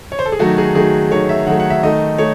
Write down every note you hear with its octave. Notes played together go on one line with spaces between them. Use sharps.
C#5
C5
A4
G#4
D#3 F#3 A3 F#4
G#4
D#3 F#3 A3 G#4
D#3 F#3 A3 C#5
E5
D#3 F#3 A3 F#5
F#5
E5
D#3 A3 D#5
A3 C#5